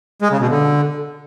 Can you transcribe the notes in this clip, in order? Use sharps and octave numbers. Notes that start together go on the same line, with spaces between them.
G#3
C#3
B2
D3